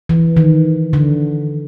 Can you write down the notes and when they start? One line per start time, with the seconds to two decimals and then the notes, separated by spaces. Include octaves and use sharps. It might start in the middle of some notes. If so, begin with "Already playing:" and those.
0.09 E3
0.37 D#3
0.93 D3